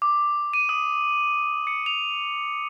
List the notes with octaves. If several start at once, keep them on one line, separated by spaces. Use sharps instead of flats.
D6
D#7
D#6
C#7
F7